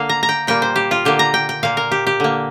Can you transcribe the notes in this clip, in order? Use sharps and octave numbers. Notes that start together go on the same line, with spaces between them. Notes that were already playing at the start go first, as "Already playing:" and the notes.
Already playing: D3 A#3 F5
A#5
A#5
G5
A#2 G3 A#3 G5
C5
G4
F4
D3 A#3 G4
A#5
G5
G5
A#2 A#3 F5
A#4
G4
G4
D3 A#3